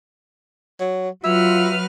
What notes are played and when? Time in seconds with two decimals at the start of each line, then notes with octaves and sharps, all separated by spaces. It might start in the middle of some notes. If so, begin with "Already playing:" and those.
0.80 F#3
1.24 F#3 F4 B4 E5 F6